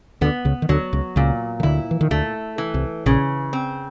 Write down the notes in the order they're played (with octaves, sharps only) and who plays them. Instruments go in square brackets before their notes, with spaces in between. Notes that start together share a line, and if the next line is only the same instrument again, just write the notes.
[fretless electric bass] D2 D3 [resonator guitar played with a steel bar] B3
[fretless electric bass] C#2 C#3
D#3
[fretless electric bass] D2 D3 [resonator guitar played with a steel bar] F#3
[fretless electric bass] C#2 C#3
[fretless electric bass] C#2 C#3 [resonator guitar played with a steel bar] A#2
[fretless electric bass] D#3
[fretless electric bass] D2 D3 [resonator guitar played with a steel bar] E4
[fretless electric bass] E3
D#3
[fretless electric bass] D2 D3 [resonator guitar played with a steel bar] A3
[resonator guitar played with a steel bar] E3
[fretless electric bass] C2 C3
[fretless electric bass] A#1 A#2 [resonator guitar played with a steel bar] C#3
[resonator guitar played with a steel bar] C4